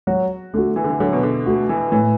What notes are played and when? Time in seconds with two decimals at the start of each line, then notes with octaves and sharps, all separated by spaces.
0.07 F#3 F#4
0.54 D3 A3 F#4
0.76 E3
0.84 D3
0.90 E3
1.00 D3 F#3
1.13 B2
1.23 D3
1.46 A3 F#4
1.69 E3
1.92 A2 E3